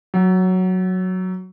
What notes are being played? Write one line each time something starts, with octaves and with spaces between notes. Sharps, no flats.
F#3